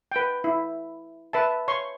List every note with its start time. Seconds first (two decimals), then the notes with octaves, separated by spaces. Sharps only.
0.12 B4 G5
0.44 E4
1.33 B4 E5 A5
1.68 C#5 C6 C#6